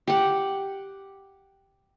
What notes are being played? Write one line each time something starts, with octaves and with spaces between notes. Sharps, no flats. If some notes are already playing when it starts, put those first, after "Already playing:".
G4 F#5